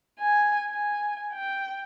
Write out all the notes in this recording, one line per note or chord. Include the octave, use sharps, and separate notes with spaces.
G#5
G#5
G5